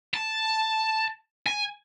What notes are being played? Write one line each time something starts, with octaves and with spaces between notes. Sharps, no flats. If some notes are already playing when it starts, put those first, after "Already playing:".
A5
G#5